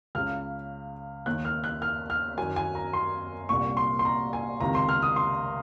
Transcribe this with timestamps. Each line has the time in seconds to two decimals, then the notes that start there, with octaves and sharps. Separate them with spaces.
0.15 C#2 C#3 F6
1.26 D#2 D#3 F#6
1.45 F6
1.64 F#6
1.82 F6
2.10 F6
2.38 F#2 D#3 G#5
2.56 G#5
2.75 A#5
2.93 C6
3.49 C2 A#2 C#6
3.77 C6
3.99 C6
4.05 A#5
4.33 G#5
4.60 C#2 C3 D#3 A#5
4.75 C6
4.89 F6
5.02 D#6
5.16 C6